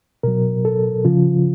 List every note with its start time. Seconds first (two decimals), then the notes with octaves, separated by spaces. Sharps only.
0.23 B2 F#3 A#4
0.65 A4
1.05 C#3 F3 F4